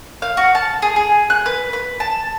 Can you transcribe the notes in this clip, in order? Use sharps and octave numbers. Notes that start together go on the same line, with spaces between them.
F5
F#4
A5
G#4
G#4
F#6
B4
B4
A5